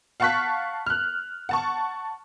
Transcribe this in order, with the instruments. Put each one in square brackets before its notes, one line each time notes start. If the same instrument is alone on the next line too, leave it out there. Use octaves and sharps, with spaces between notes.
[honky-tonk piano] F5 F#5 A5 C#6 F#6 B6
F6 F#6
F#5 A5 C#6